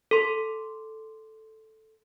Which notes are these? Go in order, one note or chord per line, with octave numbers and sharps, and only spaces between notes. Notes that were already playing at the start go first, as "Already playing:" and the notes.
A4 C6